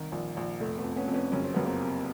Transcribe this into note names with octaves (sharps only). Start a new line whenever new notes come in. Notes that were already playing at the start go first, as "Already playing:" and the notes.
Already playing: C2 D#3
A#1
A#1
F1 A3
A3 B3
F2
B3 C#4
F2
B3 C#4
F#1 C#4
C4
F#1 B3
A#3 C4
C3